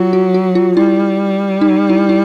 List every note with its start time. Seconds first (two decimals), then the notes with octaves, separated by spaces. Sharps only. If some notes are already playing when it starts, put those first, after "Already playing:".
Already playing: F#3 F4
0.13 F#4
0.34 F#4
0.55 F4
0.77 G3 E4
1.61 D#4
1.90 E4
2.09 E4